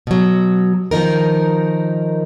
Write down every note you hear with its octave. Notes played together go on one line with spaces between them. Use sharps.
B2 F#3
D#3 F3 D#4 A#4